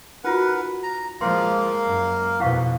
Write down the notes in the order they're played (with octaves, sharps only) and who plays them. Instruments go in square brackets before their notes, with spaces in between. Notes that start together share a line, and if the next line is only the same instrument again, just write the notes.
[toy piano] D#4 F4 F#4 [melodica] A#4 B4 F#5
[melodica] A#5
[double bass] F3 G#3 [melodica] A#3 A#4 F5 [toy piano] C6
[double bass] F#2
[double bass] F2 B2 [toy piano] E4 F5 C#6